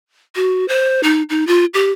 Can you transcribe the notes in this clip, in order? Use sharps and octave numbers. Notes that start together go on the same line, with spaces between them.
F#4
C5
D#4
D#4
F4
G4